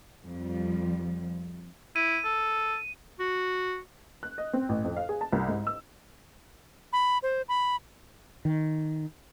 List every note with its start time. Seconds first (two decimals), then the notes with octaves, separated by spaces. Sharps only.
0.25 F2 F3 G3
1.96 E4 D#7
2.25 A4
3.20 F#4
4.23 F#6
4.38 D#5
4.53 C4
4.69 A1
4.84 F2
4.96 F5
5.09 G#4
5.21 A5
5.33 C2
5.48 G#2
5.67 E6
6.93 B5
7.23 C5
7.49 B5
8.45 D#3